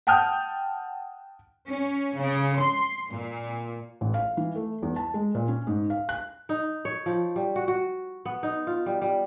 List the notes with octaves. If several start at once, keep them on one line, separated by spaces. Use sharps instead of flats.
F#5 G5 A5 D#6 F6 G6
C#4
C#3
C6
A#2
A1
F5
E3
A3
E2
A5
G#3
A#2
C#4
G#2
F5
F#6
D#4
C#5
F3
G3
F#4
F#4
B3
D#4
F4
G3
G3